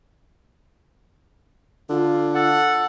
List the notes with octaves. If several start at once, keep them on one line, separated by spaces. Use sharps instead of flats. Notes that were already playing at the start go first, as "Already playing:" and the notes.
D3 F4
A4 F#5